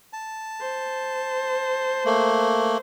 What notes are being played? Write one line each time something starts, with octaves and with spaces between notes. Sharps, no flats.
A5
C5
A3 A#3